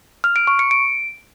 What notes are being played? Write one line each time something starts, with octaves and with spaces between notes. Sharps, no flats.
F6
D7
C#6
C#7
D7